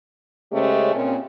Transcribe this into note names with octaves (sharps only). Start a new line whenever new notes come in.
C#3 G#3 A3 C#4 G4 C5
A#2 C#3 C4